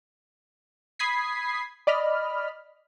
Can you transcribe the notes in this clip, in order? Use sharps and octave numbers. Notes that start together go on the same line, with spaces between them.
B5 D#6 G#6 B6 C7
D5 D#5 B5 F6